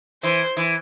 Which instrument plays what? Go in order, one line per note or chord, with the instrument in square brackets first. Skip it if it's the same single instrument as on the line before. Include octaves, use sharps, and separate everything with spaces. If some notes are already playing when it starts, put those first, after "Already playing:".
[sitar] E3 [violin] C5
[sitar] E3